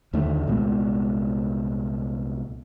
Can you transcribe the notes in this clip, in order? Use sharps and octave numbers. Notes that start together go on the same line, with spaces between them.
D#2 D3 D#3 A3
C2 A#2 G#3 B3